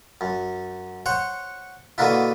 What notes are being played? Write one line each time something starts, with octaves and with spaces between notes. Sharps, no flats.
F#2
C5 C#5 F#5
B2 D3 A#3 D4 E4